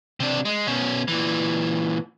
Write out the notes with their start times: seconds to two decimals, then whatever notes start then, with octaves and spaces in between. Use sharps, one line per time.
0.20 C3 D4
0.45 G#3
0.67 B2 C#4
1.08 A#2 E3